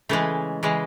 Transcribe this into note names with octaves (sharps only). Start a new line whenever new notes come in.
C#3 E3 G#3 A3
C#3 E3 G#3